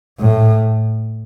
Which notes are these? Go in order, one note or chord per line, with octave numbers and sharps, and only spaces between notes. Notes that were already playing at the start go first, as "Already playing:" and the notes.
A2